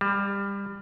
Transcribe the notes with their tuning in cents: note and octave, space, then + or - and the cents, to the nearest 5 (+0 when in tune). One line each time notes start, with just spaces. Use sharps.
G3 +25